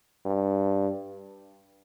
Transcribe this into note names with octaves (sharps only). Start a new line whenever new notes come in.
G2